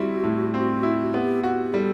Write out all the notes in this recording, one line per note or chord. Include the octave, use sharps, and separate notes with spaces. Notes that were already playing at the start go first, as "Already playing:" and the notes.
Already playing: G3 C4 E4 F#4
A2
C4
E4
B3 G4
F#4 G4
G3 A4